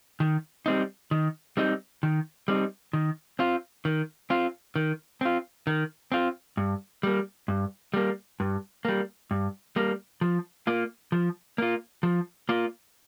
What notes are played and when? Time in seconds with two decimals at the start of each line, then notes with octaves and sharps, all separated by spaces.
0.20 D#3
0.66 G3 C4 D#4
1.11 D#3
1.57 G3 C4 D#4
2.03 D#3
2.48 G3 C4 D#4
2.93 D#3
3.39 C4 F4
3.85 D#3
4.30 C4 F4
4.76 D#3
5.21 C4 F4
5.67 D#3
6.12 C4 F4
6.57 G2
7.03 G3 A#3
7.48 G2
7.94 G3 A#3
8.40 G2
8.85 G3 A#3
9.31 G2
9.76 G3 A#3
10.21 F3
10.67 A#3 F4
11.12 F3
11.58 A#3 F4
12.03 F3
12.49 A#3 F4